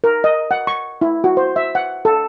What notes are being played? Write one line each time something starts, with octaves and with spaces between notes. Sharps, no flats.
A#4
D#5
F#5
C#6
E4
F#4
C5
E5
F#5
A4